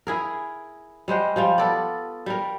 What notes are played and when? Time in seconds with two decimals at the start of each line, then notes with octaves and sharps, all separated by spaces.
0.07 E4 G#4 A#4
1.08 G3 G#3 C5 F#5
1.36 F3 G3 F4
1.58 B3 A4 D5
2.26 G3 A#4